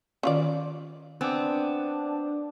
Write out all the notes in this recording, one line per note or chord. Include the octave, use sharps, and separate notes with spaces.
D#3 C#4 F4 D5 D#5
B3 C4 D4 G#5 D6